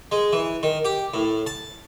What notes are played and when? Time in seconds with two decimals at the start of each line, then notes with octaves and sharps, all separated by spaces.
0.12 G#3
0.33 E3
0.63 D#3
0.85 G4
1.14 A2
1.46 A5